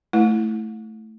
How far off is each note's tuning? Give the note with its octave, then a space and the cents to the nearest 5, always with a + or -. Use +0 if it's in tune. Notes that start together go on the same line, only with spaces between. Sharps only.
A3 +0 E4 -5